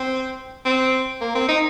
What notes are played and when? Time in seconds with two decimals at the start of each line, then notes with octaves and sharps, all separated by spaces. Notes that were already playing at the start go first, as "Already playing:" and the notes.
Already playing: C4
0.65 C4
1.21 A#3
1.35 C4
1.48 D#4